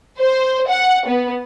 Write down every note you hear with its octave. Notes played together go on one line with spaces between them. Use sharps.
C5
F#5
B3